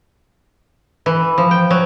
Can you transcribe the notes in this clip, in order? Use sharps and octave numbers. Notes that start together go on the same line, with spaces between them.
E3
F3
G5
F#3